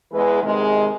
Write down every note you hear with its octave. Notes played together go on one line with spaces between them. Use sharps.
E2 E3 G#3 B4
C3 D#3 G#3